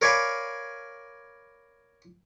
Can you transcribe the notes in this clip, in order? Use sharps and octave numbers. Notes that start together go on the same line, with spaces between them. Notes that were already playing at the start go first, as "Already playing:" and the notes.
A#4 C#5 D5 F5 G#5 B5